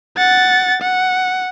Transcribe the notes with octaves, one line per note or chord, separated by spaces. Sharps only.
F#5 A6
F#5